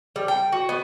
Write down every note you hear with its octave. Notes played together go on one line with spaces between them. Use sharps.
G3
G5
F#4
B3